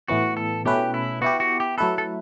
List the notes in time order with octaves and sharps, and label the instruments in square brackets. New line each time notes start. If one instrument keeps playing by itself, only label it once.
[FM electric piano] A2 E3 B3 [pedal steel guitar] F#4
[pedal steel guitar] A4
[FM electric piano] B2 A3 C#4 E4 B4 [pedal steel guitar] G4
[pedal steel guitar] E4
[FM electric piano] B3 E4 G4 [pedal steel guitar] F#4
[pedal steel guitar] F#4
G4
[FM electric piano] F#3 A3 E4 B4 [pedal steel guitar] A4
[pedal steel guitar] A4